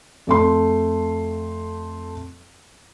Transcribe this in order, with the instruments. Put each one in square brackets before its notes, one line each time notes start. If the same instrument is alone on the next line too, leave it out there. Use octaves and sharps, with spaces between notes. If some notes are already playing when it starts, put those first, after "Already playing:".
[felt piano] F2 A3 C6